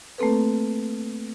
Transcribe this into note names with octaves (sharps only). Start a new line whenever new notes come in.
A3 A#3 C4 A4 B4